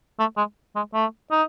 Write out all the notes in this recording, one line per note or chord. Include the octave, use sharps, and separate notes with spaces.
A3
G#3
G#3
A3
D#4